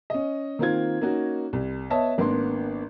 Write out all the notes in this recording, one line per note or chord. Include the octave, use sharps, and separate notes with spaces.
C#4 D#5
D#3 A#3 C4 F4 G#6
A#3 C#4 D#4 F#4
C2
B3 C#5 D#5 E5 A5
G#1 A#3 B3 D4 C6